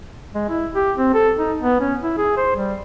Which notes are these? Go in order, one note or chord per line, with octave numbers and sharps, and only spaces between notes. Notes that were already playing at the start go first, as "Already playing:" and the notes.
G#3
E4
G4
C4
A4
D#4
B3
C#4
E4
G#4
C5
G3